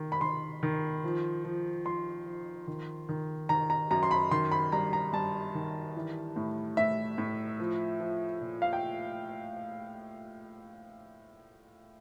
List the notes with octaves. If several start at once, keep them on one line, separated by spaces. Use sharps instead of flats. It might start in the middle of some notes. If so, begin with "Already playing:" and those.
Already playing: D#3
B5
D#3 C6
D#3
F3
F3
F3 C6
F3
D#3
D#3
D#3 A#5
A#5
F#2 A#5
C6
B5
D#3 C6
B5
G2 A#5
A#5
G2 A5
D#3
E3
A2
A2 E5
A2
F3
F3
A#2
F5
G5